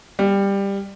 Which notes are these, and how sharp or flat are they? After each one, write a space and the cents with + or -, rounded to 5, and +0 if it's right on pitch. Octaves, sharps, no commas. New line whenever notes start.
G3 +15